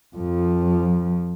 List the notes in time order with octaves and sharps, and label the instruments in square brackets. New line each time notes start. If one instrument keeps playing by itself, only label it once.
[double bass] F2 F3